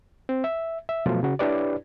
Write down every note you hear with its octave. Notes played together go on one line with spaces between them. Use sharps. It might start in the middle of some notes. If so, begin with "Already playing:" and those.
C4
E5
E5
B2 F3 F#3 A3 F4
C#3 F#4
D4 E4 G4 B4 C#5 D5